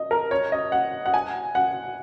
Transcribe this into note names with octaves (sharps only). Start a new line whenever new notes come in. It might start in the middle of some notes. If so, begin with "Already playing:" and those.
Already playing: D#5
A#4
C#5
D#5
F#5
F#5
G#5
F#5